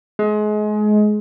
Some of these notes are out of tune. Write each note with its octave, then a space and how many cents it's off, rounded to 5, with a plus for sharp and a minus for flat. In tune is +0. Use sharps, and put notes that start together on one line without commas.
G#3 +30